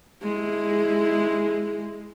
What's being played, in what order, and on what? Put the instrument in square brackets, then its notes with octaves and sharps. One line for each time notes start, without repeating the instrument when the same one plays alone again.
[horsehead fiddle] G#3 E4